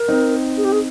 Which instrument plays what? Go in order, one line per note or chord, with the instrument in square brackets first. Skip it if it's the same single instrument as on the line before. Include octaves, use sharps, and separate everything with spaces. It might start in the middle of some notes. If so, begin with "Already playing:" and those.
Already playing: [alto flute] A#4
[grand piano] C4 D#4
[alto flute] G#4
G4
G#4